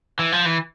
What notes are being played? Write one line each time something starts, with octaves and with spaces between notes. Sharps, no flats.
E3
F3
E3